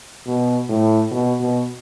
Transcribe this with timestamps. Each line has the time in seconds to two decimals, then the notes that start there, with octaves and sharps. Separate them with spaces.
0.27 B2
0.68 A2
1.11 B2
1.40 B2